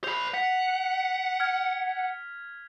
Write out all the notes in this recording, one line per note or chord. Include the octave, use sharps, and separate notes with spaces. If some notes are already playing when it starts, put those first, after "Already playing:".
C5 B5 F7
F#5 B6
F6 G#6